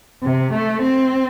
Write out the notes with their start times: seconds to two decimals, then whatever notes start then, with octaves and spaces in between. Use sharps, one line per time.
0.23 C3
0.53 A3
0.82 C4